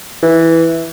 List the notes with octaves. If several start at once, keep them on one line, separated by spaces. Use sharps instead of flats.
E3